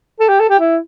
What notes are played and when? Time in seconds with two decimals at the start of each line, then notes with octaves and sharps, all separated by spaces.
0.20 A4
0.29 G4
0.40 A4
0.49 G4
0.59 E4